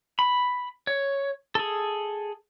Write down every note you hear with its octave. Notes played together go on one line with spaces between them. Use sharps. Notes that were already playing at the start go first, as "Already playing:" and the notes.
B5
C#5
G#4 A4